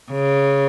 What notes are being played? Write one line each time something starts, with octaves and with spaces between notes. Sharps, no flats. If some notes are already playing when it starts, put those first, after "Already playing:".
C#3